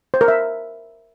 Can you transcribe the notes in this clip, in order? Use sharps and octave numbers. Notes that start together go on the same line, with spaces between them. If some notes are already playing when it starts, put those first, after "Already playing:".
C5
A#4
E5